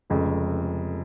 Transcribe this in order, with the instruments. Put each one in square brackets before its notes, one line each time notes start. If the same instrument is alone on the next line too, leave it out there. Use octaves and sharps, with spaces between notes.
[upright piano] F1 F2 C#3 G#3